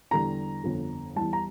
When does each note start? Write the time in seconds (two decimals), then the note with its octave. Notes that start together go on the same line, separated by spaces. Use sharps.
0.11 E2 D3 G3 A#5
0.64 G1 F2 D3
1.16 E2 E3 G3 A5
1.33 A#5